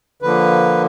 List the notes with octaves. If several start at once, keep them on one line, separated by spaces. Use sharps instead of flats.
D3 F3 A#3 B4